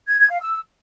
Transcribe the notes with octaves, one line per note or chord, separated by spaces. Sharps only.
G#6
G#6
F5
E6